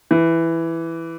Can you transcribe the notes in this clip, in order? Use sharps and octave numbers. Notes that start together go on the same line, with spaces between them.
E3